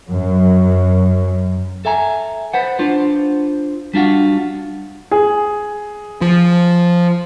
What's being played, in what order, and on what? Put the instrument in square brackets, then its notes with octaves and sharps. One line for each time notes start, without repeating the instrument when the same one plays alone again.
[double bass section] F#2
[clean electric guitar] A4 E5 G#5 A#5
B4 C5 F#5
D4 F4 C5
G3 D4 F4 F#4
[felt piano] G#4
[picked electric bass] F3